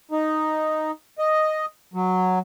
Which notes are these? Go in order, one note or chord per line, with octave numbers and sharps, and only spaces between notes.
D#4
D#5
F#3